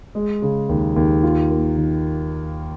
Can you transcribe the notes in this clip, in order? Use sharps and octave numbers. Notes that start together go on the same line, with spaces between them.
G#3
C#3
D#2
D#2
F4
A#3
D#3